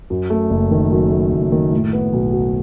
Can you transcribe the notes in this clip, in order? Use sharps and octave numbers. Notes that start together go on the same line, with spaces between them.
F#2
A3
F#1
D#3
F#2
A3
F#1
D#3
A2
B3
B1
F#3